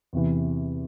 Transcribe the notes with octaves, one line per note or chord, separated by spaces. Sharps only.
E2 C3 E3